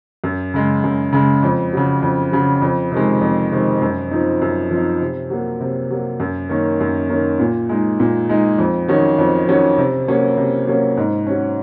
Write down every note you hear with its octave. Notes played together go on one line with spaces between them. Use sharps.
F#2
C#3 G#3
F#2
C#3 G#3
F2
C#3 F#3
F2
C#3 F#3
F2
C3 D#3 G#3
F2
C3 D#3 G#3
F#2
F3 C4 D#4
F#2
F3 C4 D#4
C3
F#3 A#3
C3
F#3 A#3
F#2
D#3 A#3 C#4
F#2
D#3 A#3 C#4
A#2
G#3 D#4
A#2
G#3 D#4
F2
D#3 F#3 C#4
F2
D#3 F#3 C#4
C3
F#3 A#3 C#4
C3
F#3 A#3 C#4
G#2
F#3 C#4